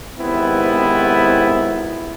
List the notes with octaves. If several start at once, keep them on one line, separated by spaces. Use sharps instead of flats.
G#1 C3 B3 C4 E4